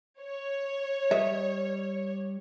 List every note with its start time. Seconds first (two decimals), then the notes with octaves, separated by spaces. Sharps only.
0.22 C#5
1.11 G3 B4 D#5 E5